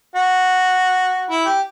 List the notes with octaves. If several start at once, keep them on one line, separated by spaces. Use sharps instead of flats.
F#4
E4
G4